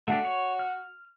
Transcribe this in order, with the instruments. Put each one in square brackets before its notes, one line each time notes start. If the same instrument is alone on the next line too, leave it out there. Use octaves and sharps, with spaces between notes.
[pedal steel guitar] A3 D4 G4 [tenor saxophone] F#4
[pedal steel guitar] C#5
F6